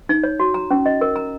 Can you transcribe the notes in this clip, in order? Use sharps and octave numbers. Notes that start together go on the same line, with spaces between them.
D#4
C#5
F#4
A#5
C#4
D#5
A#4
A#5